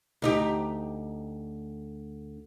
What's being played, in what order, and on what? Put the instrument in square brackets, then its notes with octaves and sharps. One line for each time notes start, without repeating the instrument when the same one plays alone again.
[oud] D2 D#4 G4